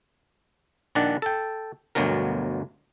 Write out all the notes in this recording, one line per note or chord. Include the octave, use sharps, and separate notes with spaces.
A#1 D#3 D4 D5 F#5
A4 G5
G1 D2 B2 F#3 A#4